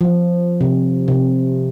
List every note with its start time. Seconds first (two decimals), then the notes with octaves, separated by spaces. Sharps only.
0.01 F3
0.61 C3
1.08 C3